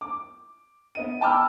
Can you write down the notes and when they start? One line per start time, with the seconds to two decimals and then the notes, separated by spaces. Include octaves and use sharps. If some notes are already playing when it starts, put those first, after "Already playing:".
0.01 D6
0.95 B3 D#5 D#7
1.21 G5 A5 B5 D6 E6 F6